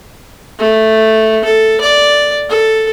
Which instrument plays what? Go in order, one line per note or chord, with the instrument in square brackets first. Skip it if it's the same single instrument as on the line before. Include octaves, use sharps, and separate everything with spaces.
[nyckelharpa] A3
A4
D5
A4